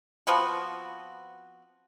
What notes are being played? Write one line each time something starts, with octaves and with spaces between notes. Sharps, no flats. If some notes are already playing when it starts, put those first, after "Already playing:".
F3 B3 C4 F#4